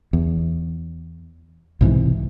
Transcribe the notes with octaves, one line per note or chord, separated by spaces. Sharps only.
E2
B1 G#2 C3 E3